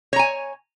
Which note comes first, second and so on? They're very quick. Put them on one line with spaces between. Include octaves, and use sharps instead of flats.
C#5 A#5 G#5